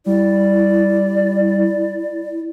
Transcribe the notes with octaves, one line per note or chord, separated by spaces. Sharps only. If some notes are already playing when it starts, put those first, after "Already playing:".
G3 E4 D5